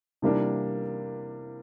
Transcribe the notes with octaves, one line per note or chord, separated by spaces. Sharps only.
C3 E3 G3 A#3 D4